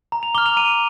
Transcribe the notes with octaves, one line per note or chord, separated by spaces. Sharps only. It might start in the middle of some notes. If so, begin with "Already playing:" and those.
A#5
F7
D6 F6 G7
F7
A#5 D#7